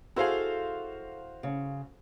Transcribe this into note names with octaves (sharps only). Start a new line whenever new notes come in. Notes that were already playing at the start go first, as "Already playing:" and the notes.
E4 F#4 G#4 A4 C5 F5
C#3